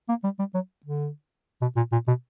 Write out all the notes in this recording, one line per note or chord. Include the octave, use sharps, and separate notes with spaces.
A#3
G3
G3
F#3
D3
B2
A#2
A#2
B2